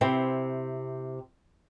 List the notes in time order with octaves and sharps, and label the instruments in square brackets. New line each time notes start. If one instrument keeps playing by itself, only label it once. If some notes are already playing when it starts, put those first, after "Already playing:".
[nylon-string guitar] C3 C4 E4